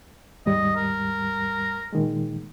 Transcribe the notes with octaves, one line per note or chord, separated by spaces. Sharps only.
D#2 G#2 G3 D#5
A#4
A#2 D#3 G#3